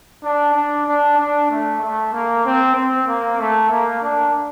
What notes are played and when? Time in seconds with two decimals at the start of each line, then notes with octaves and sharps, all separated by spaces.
0.23 D4
0.55 D4
0.86 D4
1.18 D4
1.50 A3
1.81 A3
2.13 A#3
2.44 C4
2.75 C4
3.07 A#3
3.39 A3
3.70 A#3
4.02 D4